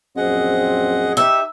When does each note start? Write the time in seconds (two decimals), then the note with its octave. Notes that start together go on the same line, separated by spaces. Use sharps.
0.17 A#1 F#2 C4 G#4 D#5 F#5
1.17 D#4 G4 E5